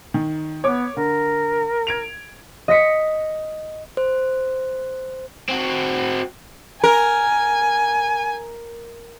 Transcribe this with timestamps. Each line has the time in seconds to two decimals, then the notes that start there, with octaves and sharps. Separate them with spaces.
0.14 D#3
0.64 B3 C#5 D6
0.97 D3 A#4
1.87 G#6 D7 F7
2.68 D#5 A#6 B6 C#7
3.97 C5
5.49 C4 F#4
6.84 A#4 G#5